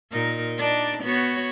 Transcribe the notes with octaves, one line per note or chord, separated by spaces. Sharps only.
A#2 D#4 A#4
D4 D#4 D5
B3 F#4 C#5